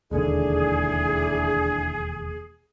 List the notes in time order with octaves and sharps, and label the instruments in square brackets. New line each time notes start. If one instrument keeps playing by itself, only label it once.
[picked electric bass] E1 D#2 D3 [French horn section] D4 E4 [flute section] G#4